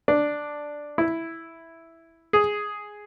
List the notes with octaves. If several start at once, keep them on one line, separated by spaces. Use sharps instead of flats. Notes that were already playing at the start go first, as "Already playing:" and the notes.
D4
E4
G#4